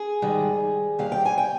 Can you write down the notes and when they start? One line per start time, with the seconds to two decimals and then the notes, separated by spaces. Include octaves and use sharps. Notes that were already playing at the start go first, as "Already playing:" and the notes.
Already playing: G#4
0.22 G#2 D#3 G3
0.98 D#2 D#3 G3 F5
1.12 G5
1.25 G#5
1.38 G5